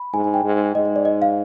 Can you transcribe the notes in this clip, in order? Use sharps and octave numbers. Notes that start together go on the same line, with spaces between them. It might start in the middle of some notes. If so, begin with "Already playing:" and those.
Already playing: B5
G#2 G#5
G#5
G5
G#2
G#2 D#5
D#5
D5
D#5
F5